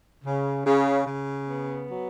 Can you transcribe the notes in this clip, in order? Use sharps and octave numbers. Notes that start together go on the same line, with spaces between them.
C#3
C#3
C#3
B3
F#3